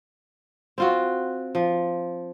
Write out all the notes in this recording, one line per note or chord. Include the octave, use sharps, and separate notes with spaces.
C4 F4 F#4
F3